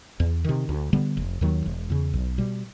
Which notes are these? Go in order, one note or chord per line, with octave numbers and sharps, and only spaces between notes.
E2
C3 D#3
D2
D3 G3 B3
F1
D#2 D#3 F#3
E1
E2 C#3
B1
B2 G3